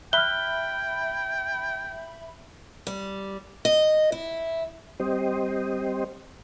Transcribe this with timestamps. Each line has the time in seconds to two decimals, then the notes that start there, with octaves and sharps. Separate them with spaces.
0.13 E5 G5 B5 F6 F#6 G7
2.87 G3
3.65 D#5
4.12 E4
5.00 G3 C4 G4 C5 D#5